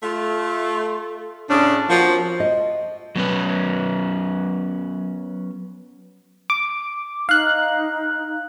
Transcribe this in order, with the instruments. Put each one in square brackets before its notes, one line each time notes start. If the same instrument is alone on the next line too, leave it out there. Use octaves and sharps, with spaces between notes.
[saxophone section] A3 F4
[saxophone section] A2 C#3 [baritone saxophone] D4
[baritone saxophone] F3 [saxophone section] A#3 C4 F#4
[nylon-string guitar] D#5
[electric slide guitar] F#3 B3 C#4 B4
[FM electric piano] D6
[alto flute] D#4 [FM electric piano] F5 F#6